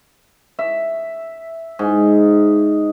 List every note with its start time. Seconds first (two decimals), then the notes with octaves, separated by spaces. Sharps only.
0.59 E5
1.79 G#2